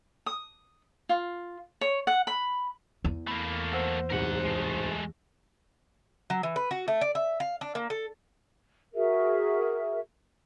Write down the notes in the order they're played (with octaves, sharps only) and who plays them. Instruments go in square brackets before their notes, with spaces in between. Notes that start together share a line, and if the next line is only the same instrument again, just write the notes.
[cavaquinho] D#6
F4
C#5
F#5
B5
[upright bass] E2
[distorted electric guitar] A3 A#3 [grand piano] B5
[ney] C5 [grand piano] F#5 E6
[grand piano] D1 C2 G#2 [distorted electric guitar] A#4 F#5
[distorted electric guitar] G#3 A3
[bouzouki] F#3
E3
B4
F#4
A3
D5
E5
F5
D4
A#3
A4
[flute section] F#4 G#4 A#4 E5